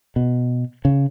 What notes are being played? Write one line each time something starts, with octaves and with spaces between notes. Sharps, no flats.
B2
C#3